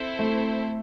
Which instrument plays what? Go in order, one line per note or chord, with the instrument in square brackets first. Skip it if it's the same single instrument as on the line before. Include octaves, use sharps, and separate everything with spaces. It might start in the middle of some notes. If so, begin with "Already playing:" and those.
Already playing: [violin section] C4 E4 A4 C5
[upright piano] A3